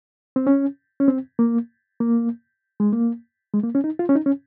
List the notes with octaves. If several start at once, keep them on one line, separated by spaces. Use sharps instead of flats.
C4
C#4
C#4
C4
A#3
A#3
G#3
A#3
G#3
A#3
C#4
D#4
F4
C#4
D#4
C#4